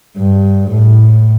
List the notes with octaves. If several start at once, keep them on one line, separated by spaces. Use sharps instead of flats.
G2
A2